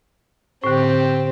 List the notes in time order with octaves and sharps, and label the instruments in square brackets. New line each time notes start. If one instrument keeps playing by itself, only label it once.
[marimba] A2 D3 [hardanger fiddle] C4 G4